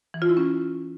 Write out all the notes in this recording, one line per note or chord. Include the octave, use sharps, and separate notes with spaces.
E3
F4
E4
C#4